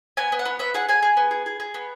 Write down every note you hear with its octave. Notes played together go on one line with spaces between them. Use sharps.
B3 G#5
B3
F#5
B3
B3 E5
G#4 F#5
G#4 G#5
G#4
B3
G#4
G#4
G#4
B3